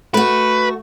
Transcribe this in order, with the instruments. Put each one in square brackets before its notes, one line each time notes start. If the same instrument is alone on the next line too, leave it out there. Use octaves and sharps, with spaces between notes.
[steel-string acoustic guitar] A3 F#4 [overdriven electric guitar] B4